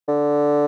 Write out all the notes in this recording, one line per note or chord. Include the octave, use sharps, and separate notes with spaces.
D3